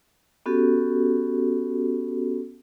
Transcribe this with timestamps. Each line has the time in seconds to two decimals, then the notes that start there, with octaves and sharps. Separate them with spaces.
0.46 B3 C#4 F#4 G4 A4